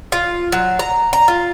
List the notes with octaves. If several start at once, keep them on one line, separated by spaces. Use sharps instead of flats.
F4
F#3
A#5
A#5
F4